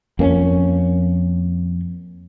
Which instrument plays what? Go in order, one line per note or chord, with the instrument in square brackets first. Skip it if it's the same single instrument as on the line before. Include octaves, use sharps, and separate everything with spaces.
[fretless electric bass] F2 A#3 C4 C#4